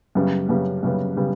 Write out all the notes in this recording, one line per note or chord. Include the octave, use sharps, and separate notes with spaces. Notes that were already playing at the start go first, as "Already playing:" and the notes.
F#2 C#3 G3 B3
F#2 C#3 G3 B3
F#2 C#3 G3 B3
C#3 G3 B3